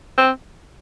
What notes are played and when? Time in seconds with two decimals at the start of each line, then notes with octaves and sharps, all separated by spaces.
0.18 C4